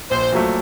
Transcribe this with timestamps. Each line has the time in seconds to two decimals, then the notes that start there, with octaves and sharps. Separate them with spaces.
0.11 A#1 C5
0.33 A#2 F#3 A3